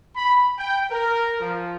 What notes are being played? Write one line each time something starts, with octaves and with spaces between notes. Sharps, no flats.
B5
G5
A#4
F3